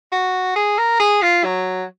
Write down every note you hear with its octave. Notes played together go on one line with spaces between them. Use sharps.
F#4
G#4
A#4
G#4
F4
F#3